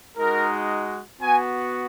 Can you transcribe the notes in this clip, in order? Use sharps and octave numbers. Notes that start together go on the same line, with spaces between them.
G#3 D#4 F#4 A#4
B3 F#4 G#5